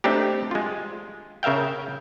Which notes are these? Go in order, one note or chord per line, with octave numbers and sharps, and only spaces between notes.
A3 C4 D4 D#4 G4
G#3 F4
C#3 A#4 E5 F5 G5